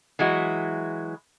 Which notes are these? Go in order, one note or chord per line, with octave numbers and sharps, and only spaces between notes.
E3 F#3 G#3 E4 F#4